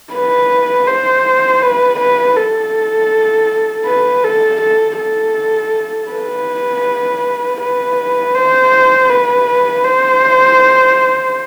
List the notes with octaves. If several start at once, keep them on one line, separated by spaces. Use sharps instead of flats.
B4
C5
B4
B4
A4
B4
A4
A4
A4
B4
B4
C5
B4
C5